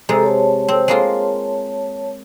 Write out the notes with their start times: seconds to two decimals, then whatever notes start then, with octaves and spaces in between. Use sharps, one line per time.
0.09 C3 G#3 A4 C5 A#5
0.23 C#5 A5
0.68 C4
0.88 G#3 A#3 F4